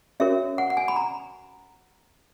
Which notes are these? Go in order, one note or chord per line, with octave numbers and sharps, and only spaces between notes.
C#4 F#4 A#4 C#5 E5
F#5
F#5
G#5
B5
A#5